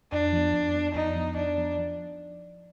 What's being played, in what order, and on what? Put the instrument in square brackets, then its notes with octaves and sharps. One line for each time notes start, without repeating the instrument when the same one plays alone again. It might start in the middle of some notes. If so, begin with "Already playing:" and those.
[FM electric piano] F2 [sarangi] D4
[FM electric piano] F3 B3
F2
F3 B3
[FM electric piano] F2 [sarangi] D#4
[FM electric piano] F3 B3
[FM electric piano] F2 [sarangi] D4
[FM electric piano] F3 B3
F3